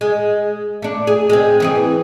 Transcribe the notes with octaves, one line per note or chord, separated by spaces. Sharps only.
G#3
A3 D4
G#4
G#3 C4
E3 C4 G#4